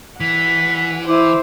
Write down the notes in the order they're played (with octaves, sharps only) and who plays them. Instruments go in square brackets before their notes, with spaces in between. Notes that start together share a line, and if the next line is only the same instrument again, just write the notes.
[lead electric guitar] E3 [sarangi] F#5 [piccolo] B6
[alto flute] E4 [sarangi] C5 [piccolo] D6